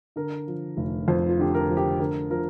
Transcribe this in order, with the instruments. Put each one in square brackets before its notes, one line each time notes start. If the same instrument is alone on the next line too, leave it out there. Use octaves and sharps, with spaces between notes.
[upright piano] D3 A#4
F3
F1
F2 C5
F4
D3 G4
A#4
F3
G4
D3 A#4
F3 A#4